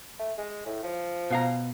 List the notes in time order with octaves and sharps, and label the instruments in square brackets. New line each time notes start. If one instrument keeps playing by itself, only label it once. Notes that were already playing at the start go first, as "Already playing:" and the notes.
[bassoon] A3
G#3
A2
F3
[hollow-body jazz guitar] B2 F5 A#5